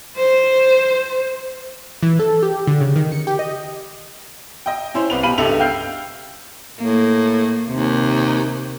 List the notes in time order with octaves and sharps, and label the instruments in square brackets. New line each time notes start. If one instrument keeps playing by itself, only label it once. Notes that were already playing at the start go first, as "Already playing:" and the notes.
[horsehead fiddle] C5
[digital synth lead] E3
A4
G4
D3
C#3
D#3
C#7
G4
D#5
[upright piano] D#5 G5
C#4 E4 C5 C#5
C2 B4 F7
B2 G4 F5 B5 D#7 F#7
C#2 G2 G4 A4 E5 F7
F5 G5 E6 F6 G6 C7
[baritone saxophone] A2 [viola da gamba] A#3
[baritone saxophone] D#2 [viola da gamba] C3